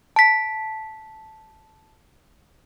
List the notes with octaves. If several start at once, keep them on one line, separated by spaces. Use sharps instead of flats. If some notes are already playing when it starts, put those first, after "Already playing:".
A5 B6